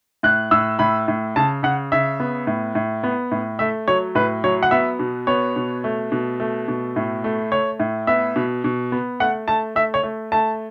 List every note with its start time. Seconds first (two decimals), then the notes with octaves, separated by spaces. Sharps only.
0.23 A2 F#6
0.51 A2 E6
0.79 A2 B5
1.08 A2
1.36 C#3 A5
1.63 C#3 F#5
1.92 C#3 E5
2.20 B3
2.47 A2
2.75 A2
3.03 B3
3.31 A2
3.59 A3 E5
3.88 F#3 C#5
4.15 A2 B4
4.44 F#3 C#5
4.63 F#5
4.71 B3 E5
4.99 B2
5.27 B3 C#5
5.56 B2
5.84 A3
6.12 B2
6.40 A3
6.68 B2
6.96 A2
7.24 A3
7.52 A3 C#5
7.80 A2
8.07 B3 E5
8.36 B2
8.64 B2
8.92 B3
9.20 A3 F#5
9.48 A3 A5
9.75 A3 E5
9.94 C#5
10.03 A3
10.32 A3 A5